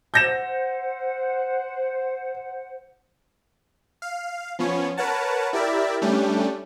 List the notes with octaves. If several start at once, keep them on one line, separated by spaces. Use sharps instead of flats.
C5 F#5 G6 A#6 E7
F5
F3 B3 C#4 C#5
A#4 B4 C#5 F#5 A5
E4 G4 A#4 D5 E5
G3 A3 C#4 D4 G4